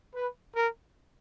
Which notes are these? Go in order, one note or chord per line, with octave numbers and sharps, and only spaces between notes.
B4
A#4